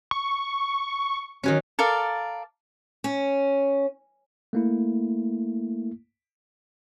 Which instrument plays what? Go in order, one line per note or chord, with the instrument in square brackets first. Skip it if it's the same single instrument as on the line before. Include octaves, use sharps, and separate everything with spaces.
[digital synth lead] C#6
[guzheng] D#3 F#3 C#4
[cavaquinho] A4 A#4 D5 F5
[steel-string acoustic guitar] C#4
[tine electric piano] A3 A#3 E4